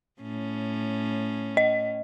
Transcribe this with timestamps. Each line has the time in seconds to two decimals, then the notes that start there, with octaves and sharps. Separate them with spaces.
0.21 A2 C#4
1.57 D#5